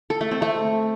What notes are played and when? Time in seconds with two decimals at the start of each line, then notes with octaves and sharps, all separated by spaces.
0.10 A4
0.21 A3
0.31 C4
0.42 A3